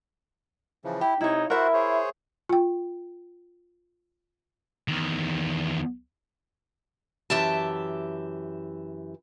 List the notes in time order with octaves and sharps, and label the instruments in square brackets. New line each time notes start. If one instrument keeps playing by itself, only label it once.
[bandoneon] C#3 E3 F3
[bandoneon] E4 [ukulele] G4
[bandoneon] C3 [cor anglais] D#4 [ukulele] E4 C#5
[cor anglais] E4 [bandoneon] F#4 C5 F#5 [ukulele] A#4 E5
[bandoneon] G#4 C5 C#5
[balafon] F4 G5
[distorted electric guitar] E2 D#3
[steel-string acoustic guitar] F#2 E3 G4 E5 A5